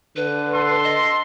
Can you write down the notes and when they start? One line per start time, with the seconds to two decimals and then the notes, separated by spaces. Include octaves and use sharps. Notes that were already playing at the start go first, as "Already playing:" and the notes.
0.16 D3 B4
0.53 A4 C6
0.84 D#5